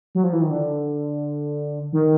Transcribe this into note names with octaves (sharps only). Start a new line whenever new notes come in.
F#3
F3
E3
D#3
D3
D#3